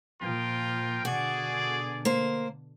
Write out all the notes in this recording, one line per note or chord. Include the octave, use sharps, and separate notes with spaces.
A#2 F3 F4 A#4 G5
B2 D3 F#4 G#4 D5
A#3 C5